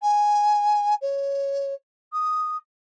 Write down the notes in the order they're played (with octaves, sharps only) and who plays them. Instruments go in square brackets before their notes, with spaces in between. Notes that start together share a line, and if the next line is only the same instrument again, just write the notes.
[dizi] G#5
C#5
D#6